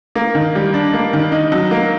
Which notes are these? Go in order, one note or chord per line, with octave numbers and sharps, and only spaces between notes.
A#3
D#3
G3
D4
A#3
D#3
D#4
F#3
A#3